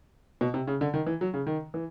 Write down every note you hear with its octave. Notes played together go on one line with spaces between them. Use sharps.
B2
C3
C#3
D3
D#3
E3
F#3
C#3
D#3
E3